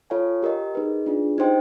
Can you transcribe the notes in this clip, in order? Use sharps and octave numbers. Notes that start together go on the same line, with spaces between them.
F4 A4 C#5 F5 G#5
G4 A#4 D#5
D#4 G#4 B4 D#5
D4 F4 G#4 B4
D#4 G4 C5 D#5 G5